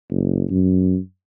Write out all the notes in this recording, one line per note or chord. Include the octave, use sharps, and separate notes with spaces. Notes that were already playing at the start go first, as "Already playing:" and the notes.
F#1
F#2